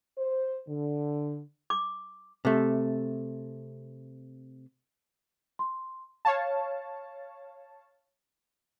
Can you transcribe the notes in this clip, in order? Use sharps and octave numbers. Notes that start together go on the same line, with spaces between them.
C5
D3
D6
C3 A3
C6
C#5 F5 A5